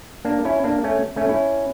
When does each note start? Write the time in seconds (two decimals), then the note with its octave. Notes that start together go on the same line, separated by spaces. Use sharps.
0.25 A#3 D4
0.45 C#4 E4
0.64 A#3 D4
0.84 A3 C#4
1.16 A3 C#4
1.29 C#4 E4